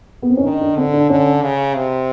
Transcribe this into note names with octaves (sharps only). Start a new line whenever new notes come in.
B3
C4
C#4
D#3 D4
D4
D3 C4
D4
D3 C#4
C#3
C3